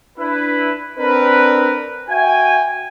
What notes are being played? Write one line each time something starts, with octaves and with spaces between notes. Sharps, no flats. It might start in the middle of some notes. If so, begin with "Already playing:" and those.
D4 E4 B4
C4 D4 A#4 B4
F#4 E5 G5 G#5